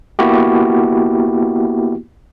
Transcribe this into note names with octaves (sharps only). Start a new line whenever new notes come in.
A#3 B3 E4 F#4 G4